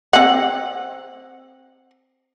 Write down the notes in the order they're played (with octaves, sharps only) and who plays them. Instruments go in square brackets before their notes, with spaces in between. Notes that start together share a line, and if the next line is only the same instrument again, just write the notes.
[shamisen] C4 F#5